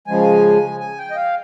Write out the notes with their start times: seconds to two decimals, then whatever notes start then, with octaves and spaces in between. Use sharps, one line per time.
0.07 C#3 F3 G#3 G#5
0.80 G#5
0.98 G5
1.11 D#5
1.16 F5